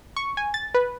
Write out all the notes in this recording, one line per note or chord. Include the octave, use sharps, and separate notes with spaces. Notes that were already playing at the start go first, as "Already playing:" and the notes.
C#6
G#5
A6
B4